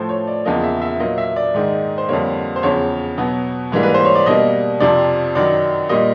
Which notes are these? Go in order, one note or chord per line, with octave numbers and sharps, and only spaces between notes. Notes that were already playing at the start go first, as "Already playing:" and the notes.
Already playing: A2 F3 A3 C5
C#5
D5
E2 C#3 F3 A#3 D#5
E5
E5
A#2 F#3 A#3 D#5
E5
D5
G#2 D#3 G#3
C5
F2 D3 G3 A#3 C#5
C5
E2 C#3 F3 C#5
B2 F#3 B3
G#2 E3 G3 A#3
B4
C5
C#5
D5
B2 G3 A#3 D#5
F2 C3 F3 D5
F#2 D#3 F#3 D5
A#2 G3 A#3 D#5